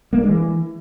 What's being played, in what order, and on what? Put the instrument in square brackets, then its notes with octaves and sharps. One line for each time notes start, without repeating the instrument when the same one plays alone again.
[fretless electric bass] A#3
D4
G#3
E3